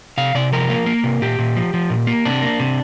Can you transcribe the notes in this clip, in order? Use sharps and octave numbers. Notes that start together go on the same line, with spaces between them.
C3 F5
C3 D5
F3 A#4
A#3
A#3
C3
A#2 G4
A#2
F3
F3
A#2
A#3
C3 D4
A#3
C3